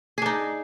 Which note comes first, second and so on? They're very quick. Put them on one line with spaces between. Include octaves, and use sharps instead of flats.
G#4 D4 D#4